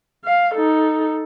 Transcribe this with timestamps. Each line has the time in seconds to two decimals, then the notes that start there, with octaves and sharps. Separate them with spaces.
0.24 F5
0.54 D#4 A4